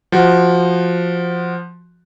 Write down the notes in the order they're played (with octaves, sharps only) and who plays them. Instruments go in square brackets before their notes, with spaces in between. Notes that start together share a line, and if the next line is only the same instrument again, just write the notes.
[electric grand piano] F3 F#4